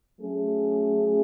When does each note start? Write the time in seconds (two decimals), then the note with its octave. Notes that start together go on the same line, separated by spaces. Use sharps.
0.19 F#3 A3 C#4 G#4